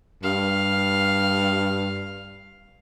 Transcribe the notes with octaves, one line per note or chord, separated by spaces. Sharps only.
G2 F5